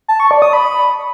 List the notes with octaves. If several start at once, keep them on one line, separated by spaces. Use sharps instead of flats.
A5
C#6
D5
D#6
B5